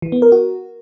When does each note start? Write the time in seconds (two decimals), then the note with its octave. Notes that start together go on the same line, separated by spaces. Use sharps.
0.02 E3
0.12 B3
0.22 A#4
0.32 F#4